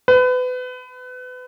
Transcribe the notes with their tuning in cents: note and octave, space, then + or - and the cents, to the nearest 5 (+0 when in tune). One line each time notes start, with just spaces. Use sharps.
B4 +30